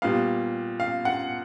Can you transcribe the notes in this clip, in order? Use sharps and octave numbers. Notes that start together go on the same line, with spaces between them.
A#2 G3 B3 F5
F5
F#5